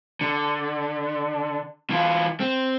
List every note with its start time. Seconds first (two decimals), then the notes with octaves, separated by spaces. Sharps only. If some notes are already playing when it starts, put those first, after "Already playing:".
0.21 D3
1.90 E3 F4
2.40 C4